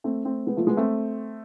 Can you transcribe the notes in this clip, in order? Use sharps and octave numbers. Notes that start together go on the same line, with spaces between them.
A3 C4
A3 C4
G#3 B3
F3 A3
G#3 B3
A3 C4